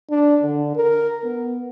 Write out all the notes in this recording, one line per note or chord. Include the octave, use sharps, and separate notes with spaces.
D4
D3
A#4
B3